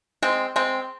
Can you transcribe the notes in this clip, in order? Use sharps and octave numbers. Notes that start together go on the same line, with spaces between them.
G#3 C4
G#3 C4